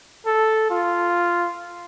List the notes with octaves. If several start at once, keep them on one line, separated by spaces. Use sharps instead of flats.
A4
F4